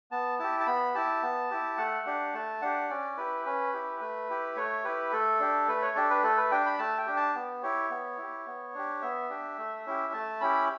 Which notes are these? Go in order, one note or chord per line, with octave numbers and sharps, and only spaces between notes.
B3 A5
E4 G4 A5
A5
B3 B5
E4 G4 A5
B3
E4 G4
A3 F#5
D4 G4
A3 A5
D4 G4 F#5
C#4 D5
E4 G4 B4
C#4 B4
E4 G4
A3 B4
E4 G4
A3 C#5
E4 G4 B4
A3 A4
D4 G4
A3 B4
C#5
D4 G4 A4
B4
A3 A4
B4
D4 G4 G5
B5
A3 A5
G5
D4 G4
A5
B3
E4 G4 C#5
B3
E4 G4
B3
D4 G4
B3 E5
D4 G4
A3
C#4 E4 G4
A3 A5
C#4 E4 G4 B5